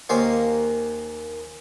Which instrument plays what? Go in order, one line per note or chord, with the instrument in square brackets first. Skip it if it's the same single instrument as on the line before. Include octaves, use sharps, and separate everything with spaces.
[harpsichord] D#2 A#3 C#4 C5 F5